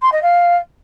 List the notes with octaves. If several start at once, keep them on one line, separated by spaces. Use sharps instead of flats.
C6
D#5
F5